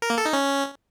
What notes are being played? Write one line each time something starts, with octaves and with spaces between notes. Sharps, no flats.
A#4
A#3
A4
D#4
C#4